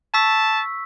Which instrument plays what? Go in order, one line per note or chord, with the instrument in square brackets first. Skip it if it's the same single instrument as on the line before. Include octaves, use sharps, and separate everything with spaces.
[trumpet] A5 [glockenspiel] C#6 E6 B6